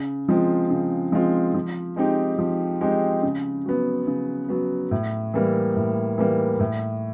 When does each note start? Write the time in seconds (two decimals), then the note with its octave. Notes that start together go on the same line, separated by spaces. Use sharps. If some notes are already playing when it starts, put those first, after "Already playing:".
Already playing: C#3
0.28 F3 G#3 C4 F4
0.70 C#3
1.12 F3 G#3 C4 F4
1.54 F3
1.96 G#3 C4 D#4 G4
2.39 F3
2.81 G#3 C4 D#4 G4
3.23 C#3
3.66 F#3 B3
4.07 C#3
4.49 F#3 B3
4.91 A2
5.34 E3 G3 A#3
5.76 A2
6.18 E3 G3 A#3
6.60 A2